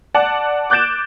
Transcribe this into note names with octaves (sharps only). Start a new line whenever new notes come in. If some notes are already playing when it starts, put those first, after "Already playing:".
D5 F#5 A5
D6 F#6 G6 A6 D7 E7